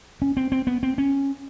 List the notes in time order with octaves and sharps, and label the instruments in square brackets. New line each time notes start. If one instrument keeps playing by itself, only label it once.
[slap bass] C#4
C4
C4
B3
C4
C#4